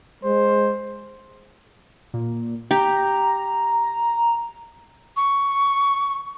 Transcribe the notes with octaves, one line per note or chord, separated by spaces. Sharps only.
G#3 C5
A#2
G4 A#5
C#6